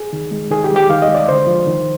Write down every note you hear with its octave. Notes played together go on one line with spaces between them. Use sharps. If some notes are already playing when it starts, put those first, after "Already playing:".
Already playing: G#4
D#3
G#3
D#3 G#4
G4
G3
G4
D#3 F5
D#5
G#3
D5
D3 C5
F3
D#3